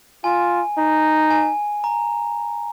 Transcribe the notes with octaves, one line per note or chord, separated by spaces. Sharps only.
F4 G#5
D#4
G#5
A#5